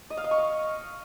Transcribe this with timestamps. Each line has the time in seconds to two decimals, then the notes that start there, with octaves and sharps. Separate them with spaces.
0.10 D#5
0.17 F5
0.24 D#5
0.31 C#6
0.38 D#5